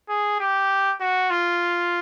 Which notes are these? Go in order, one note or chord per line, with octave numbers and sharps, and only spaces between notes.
G#4
G4
F#4
F4